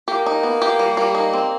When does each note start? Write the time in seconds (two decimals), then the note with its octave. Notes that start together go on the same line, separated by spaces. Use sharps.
0.08 A#3 G4
0.26 D#4
0.43 B3
0.62 G4
0.79 G3
0.97 G3
1.15 D#4
1.33 C4